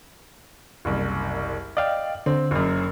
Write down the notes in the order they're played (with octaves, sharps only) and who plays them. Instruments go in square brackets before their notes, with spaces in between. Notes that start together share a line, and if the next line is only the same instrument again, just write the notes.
[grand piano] F#1 C2
[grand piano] D5 [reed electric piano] D#5 F5 G5
[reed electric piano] D3 [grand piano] C4
[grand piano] F#1 F#2